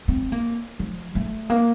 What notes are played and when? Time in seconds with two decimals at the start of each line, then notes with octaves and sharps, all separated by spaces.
0.08 C4
0.32 A#3
0.79 F3
1.15 A3
1.50 A#3